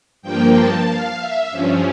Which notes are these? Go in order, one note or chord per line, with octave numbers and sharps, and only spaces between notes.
G2 F3 A#3 G5
A5
F5
E5
G2 F3 C#4